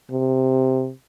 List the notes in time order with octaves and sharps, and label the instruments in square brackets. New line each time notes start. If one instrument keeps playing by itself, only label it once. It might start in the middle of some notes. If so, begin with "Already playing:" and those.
[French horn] C3